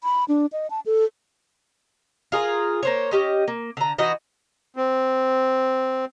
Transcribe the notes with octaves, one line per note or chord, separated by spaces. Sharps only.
B5
D4
D#5
A5
A4
F4 G#4 A#4
A#3 C5 C#5
C#4 G4 D#5
A#3
D3 A#5
E3 D#4 F#4 D#5
C4